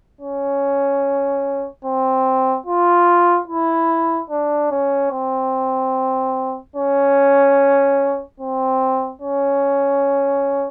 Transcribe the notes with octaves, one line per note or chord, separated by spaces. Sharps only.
C#4
C4
F4
E4
D4
C#4
C4
C#4
C4
C#4